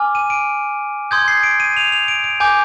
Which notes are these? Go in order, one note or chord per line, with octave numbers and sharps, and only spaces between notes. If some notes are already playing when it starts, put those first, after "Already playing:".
Already playing: G#5 D6 F6
D#7
D7
C6 D#6 G6 G#6
C7
D7
D#7
F7
F7
D7
D7
G#5 D6 G6